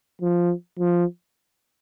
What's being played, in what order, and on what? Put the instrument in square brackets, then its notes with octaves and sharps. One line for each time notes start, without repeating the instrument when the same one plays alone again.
[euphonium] F3
F3